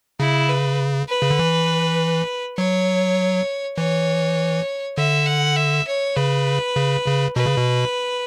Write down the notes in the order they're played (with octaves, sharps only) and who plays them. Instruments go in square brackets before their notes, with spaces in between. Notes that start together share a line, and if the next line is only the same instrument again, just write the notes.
[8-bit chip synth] C#3 [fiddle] E4
[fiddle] B4
B4
[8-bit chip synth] C#3
D3
E3
[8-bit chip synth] F#3 [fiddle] C#5
[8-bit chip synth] E3 [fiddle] C#5
[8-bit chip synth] D3 [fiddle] E5
[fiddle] F#5
E5
C#5
[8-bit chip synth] C#3 [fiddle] B4
[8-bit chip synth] C#3
C#3
[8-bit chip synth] B2 [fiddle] B4
[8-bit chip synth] C#3
B2